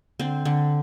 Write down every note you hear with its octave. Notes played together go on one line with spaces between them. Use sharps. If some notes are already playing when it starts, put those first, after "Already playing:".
D3 C4
D3